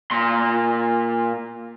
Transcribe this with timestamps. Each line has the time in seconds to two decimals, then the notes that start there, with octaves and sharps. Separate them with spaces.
0.11 A#2 C6